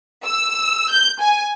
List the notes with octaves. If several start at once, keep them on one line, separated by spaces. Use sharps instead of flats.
E6
G6
G#5